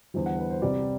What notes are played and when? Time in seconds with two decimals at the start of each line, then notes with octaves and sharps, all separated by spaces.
0.14 E2 D3 G3 C5
0.26 F#5
0.39 B4
0.50 C5
0.62 C2 C3 G3 D5